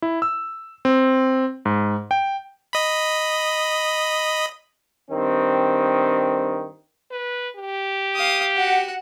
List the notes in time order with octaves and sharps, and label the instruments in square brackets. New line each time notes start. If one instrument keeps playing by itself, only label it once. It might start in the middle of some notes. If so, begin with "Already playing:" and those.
[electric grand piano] E4
E6
C4
G#2
G5
[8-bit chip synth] D#5 B5
[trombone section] G2 D#3 C4
[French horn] B4
G4
[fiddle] F5 D#6
F#4 F#5